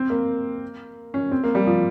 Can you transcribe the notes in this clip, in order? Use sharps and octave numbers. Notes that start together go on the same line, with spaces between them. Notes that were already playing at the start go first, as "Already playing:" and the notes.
Already playing: C4
A#3
C#4
C4
A#3
G3
F3